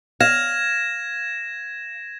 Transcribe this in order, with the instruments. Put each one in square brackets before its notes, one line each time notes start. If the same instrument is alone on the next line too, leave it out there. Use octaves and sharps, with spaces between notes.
[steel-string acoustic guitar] F5 [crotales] G#6 A#6 E7